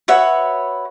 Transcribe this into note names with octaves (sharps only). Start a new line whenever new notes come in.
F#4 B4 C#5 E5